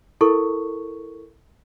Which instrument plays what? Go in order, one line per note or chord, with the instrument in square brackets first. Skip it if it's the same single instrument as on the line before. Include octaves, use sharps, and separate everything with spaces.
[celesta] E4 A4 A#4 C#6